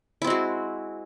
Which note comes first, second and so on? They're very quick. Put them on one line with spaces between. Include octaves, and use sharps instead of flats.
E4 C4 G#3 F#4